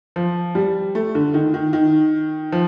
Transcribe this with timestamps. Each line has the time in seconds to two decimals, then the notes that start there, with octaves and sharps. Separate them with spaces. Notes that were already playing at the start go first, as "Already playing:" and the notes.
0.16 F3
0.55 G3
0.95 A3
1.15 D3
1.34 D#3
1.54 D#3
1.73 D#3
2.52 F3